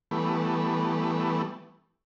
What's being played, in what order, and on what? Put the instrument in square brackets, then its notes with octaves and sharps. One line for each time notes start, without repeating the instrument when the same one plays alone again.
[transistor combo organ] E3 G3 A3 B3